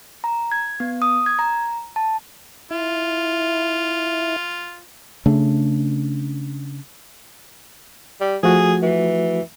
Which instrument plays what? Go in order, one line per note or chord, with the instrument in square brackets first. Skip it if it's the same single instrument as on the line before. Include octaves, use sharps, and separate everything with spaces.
[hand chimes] A#5
G#6
B3
D#6
G#6
A#5
A5
[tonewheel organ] E4 [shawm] F4
[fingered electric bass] C#3 A3 D4
[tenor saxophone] G3
[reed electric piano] F3 A3 F#4 [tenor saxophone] G#4
[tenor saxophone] E3